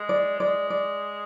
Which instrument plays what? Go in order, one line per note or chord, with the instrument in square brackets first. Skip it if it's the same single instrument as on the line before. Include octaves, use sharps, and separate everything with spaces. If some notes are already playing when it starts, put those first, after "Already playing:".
Already playing: [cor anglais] G#3
[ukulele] D5
[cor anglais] G#3 [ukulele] D5
[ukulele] D5